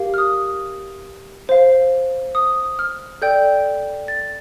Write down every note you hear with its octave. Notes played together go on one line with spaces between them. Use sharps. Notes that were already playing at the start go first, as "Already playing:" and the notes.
Already playing: G4 A#4 F5
F6
D#6
C5 F5
D#6
F6
A4 D5 G5 G6
A6